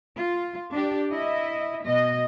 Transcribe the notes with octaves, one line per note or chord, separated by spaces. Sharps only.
F4
D4 G4
E4 D#5 E5
B2 D#5